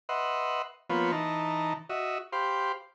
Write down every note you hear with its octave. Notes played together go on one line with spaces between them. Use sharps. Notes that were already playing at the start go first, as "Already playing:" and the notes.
B4 D#5 E5 F#5 C6
F3 A#3 B3 F4 B4 C#5
E3 D#4 A5 A#5
F#4 D#5 E5
G4 C5 F5 B5 C6